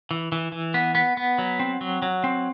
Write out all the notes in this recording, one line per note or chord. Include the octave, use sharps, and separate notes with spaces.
E3
E3
E3
B3
B3
B3
F#3
C4
F#3
F#3
C4